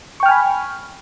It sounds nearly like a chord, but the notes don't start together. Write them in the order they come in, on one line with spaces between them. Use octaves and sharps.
C#6 G5 F6 G#5 B5